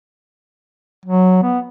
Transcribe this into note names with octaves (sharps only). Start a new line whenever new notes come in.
F#3
B3